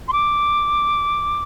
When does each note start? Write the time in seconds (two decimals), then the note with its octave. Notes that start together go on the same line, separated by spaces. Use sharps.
0.08 C6
0.13 D6